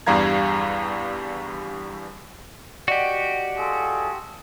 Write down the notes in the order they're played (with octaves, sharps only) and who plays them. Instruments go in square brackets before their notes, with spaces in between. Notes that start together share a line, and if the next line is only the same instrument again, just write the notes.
[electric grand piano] E2 G2 G3 F5 A#5 G#6
[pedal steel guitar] F#4 G4 [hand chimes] D5 D#5 F#5
[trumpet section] F4 G#4 A4